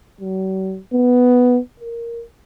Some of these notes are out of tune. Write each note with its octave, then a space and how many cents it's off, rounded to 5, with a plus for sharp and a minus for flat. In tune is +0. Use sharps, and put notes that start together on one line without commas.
F#3 +45
B3 +5
A#4 +0